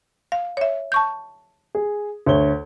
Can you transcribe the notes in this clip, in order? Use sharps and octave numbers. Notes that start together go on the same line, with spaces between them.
F5
C#5 E5
A5 C#6 G6
G#4
D2 C#5 G7